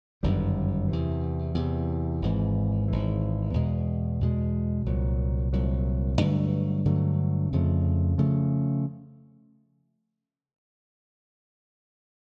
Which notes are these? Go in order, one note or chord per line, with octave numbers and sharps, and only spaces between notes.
G1 F#2 D#3 G3
E2 C3 E3
E2 C3 E3
G#1 G#2 E3
G#1 G#2 E3
E2 B2 G#3
E2 B2 G#3
C2 A#2 F#3
C2 A#2 F#3
G2 D3 F#3 A3
G2 D3 F#3 A3
F2 C#3 F3 A3
C#3 F3 A3